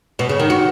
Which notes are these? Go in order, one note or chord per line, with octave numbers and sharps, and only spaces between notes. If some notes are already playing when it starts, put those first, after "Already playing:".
B2
C#3
D#3
F#4